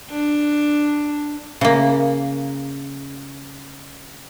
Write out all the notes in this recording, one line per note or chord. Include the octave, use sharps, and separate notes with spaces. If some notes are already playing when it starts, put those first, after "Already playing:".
D4
C#3 A#3